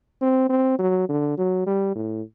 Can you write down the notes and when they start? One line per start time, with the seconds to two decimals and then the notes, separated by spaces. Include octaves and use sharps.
0.21 C4
0.49 C4
0.79 F#3
1.09 D3
1.38 F#3
1.66 G3
1.95 A2